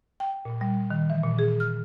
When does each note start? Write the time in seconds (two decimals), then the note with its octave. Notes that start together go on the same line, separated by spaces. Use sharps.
0.20 G5
0.45 A#2
0.61 G3
0.91 D#3
1.10 E3
1.23 A#2
1.39 G#4
1.60 F6